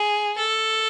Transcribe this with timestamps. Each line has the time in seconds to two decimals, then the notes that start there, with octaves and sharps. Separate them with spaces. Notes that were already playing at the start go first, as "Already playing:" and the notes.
Already playing: G#4
0.38 A4